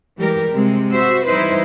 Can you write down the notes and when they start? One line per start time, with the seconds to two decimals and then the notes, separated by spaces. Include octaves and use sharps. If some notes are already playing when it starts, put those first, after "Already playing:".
0.18 E3 G3 G#3 G4 A#4
0.51 C3 G#3 C4
0.93 F#4 C5 E5
1.26 E3 G3 D#4 E4 B4 C5